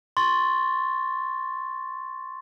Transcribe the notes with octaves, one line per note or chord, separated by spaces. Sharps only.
C6 C#6 A6